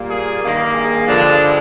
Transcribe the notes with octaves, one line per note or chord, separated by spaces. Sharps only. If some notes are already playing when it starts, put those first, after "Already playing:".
Already playing: A#2 G3 A#3
G#4
G2 D#3 A#3
G#4
G2 D3 F3 G#3 D4